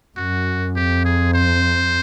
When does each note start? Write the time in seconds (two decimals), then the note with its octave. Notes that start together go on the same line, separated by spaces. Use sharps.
0.17 F#2 F#4
0.76 F2 G4
1.05 G#4
1.34 C5